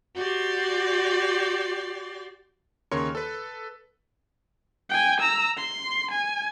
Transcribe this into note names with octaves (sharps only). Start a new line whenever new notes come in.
F#4 G4 D5 C6
D#2 C#3 A#4 C#5 C6 C#6
A4 B4
G5 G#5
A#5 E6
C6
G#5